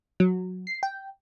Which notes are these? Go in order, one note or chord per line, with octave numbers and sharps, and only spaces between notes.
F#3
C7
G5